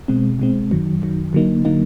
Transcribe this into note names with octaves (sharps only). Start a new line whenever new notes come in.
B2 G#3 C4
B2 G#3 C4
F#2 D#3 F#3
F#2 D#3 F#3
D3 F#3 A#3 D#4
D3 F#3 A#3 D#4